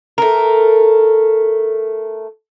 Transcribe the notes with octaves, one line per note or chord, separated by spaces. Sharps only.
A3 A#4